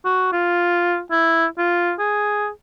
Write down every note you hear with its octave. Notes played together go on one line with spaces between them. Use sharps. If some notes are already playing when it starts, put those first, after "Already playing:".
F#4
F4
E4
F4
G#4